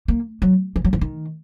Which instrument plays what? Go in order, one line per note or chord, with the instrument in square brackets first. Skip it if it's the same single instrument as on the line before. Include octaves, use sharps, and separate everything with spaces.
[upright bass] A#3
F#3
E3
F#3
E3
D#3